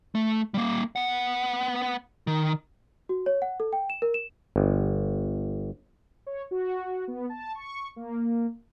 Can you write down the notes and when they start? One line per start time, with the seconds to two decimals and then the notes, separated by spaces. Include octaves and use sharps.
0.15 A3
0.54 G3 A#3
0.96 B3 F#5
2.27 D#3
3.09 F#4
3.26 C#5
3.42 F#5
3.60 A4
3.73 G5
3.90 E7
4.02 A#4
4.14 E7
4.56 G1
6.26 C#5
6.51 F#4
7.08 B3
7.29 A5
7.55 C#6
7.96 A#3